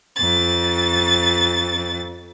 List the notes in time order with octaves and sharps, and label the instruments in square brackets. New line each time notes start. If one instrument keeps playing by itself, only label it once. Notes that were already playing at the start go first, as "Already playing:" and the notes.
[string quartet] F2 A6